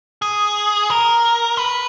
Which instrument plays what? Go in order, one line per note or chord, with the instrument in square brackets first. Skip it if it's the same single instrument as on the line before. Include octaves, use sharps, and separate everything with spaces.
[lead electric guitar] G#4
A#4
B4